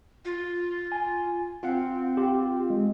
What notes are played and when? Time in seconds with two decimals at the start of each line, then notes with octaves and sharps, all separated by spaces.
0.25 F4
0.92 G#5
1.63 C4 F4 F5 F#5
2.17 F4 G4
2.70 G#3